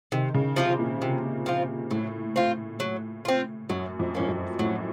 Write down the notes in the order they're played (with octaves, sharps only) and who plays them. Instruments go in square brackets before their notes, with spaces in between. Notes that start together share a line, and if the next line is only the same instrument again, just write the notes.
[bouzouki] C3 [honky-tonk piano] D#3
[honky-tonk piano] C#3
[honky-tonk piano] C3 [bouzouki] F3 C4 F4
[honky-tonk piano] A#2
[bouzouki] C3
F3 C4 F4
[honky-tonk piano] A2 [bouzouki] F#3
[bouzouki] C4 F4
F#3
C4 F4
[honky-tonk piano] F#2 [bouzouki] F#3
[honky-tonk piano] F2
[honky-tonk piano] F2 [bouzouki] A#3 C#4
[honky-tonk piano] F#2
[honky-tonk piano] A2 [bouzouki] F#3